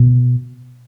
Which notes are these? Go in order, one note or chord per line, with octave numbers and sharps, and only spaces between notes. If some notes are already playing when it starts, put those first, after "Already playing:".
Already playing: B2